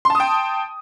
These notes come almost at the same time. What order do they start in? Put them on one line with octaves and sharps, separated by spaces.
C6 A5 D#6 G5